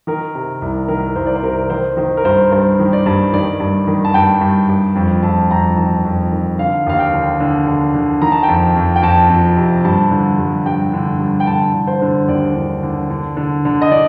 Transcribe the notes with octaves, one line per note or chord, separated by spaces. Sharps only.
D#3 A#4
C3
C2
D#3 A#4
C2 C5
D5
C5
C3 A#4
D#3 C5
D#3 C5
A#4
G2 C5
G2 C5
D#3
D5
G2
D#3 D5
G2
D#3
A5
G2 G5
G2
G2
F2
F2 A5
F2 A#5
D#3 A5
F2
D#3
D3 F5
D#2 F5
G5
D3
D3
D3
D3
D#3 A#5
A5
G5
F2
A5
F2
G5
F2 A5
F2
C3
G2 A5
D3
G2
G2 G5
D3
G2
G5
D3 A5
D3
C5
D3
D#2 D5
D3
D3
D3
D3
D3
D#5
D3 D5